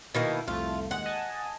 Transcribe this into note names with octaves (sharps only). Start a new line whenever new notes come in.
B2 D#3 A#3 E4
C2 F2 A3 F4
D#2 G#3 F#5
D#5 G#5 A5